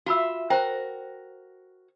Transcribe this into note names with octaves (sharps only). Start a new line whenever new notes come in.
F4 F#4 E5 B5 E6
F#4 A#4 C5 G5